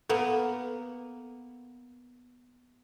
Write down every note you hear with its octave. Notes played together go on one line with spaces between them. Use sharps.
A#3 B3 A4